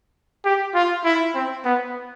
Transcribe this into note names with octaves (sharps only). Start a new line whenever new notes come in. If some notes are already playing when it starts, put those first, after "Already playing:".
G4
F4
E4
C4
B3